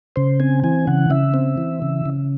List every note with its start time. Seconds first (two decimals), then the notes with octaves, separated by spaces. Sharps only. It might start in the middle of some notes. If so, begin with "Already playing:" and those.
0.16 C#3 C5
0.40 C4 G#5
0.64 E3 G#5
0.87 C#3 F#5
1.10 C#3 E5
1.34 C4
1.57 E3
1.82 C#3
2.05 C#3